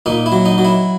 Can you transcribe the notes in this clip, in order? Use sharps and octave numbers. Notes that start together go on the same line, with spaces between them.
A#2 D#4
E4
F#3
D#4
F#3
E4